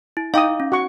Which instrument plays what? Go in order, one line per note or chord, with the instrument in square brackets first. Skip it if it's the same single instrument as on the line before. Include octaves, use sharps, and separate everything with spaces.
[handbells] E4
[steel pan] D#4 G5 D#6 [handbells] F5 D6
[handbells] C#4
[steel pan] F#4 F#5 C#6